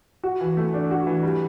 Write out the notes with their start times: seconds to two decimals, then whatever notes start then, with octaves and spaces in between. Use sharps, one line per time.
0.24 F#4
0.41 E3
0.57 A3
0.74 D4
0.91 F#4
1.07 E3
1.23 G3